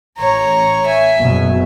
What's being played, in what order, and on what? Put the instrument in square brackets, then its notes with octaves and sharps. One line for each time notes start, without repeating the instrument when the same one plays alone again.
[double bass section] A1 [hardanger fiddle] C#5 A#5
[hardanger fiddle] E5 G#5
[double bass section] F#1 B2 F#3